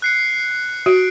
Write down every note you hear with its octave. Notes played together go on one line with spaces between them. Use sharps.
F#6 C7 C#7
F#4 D7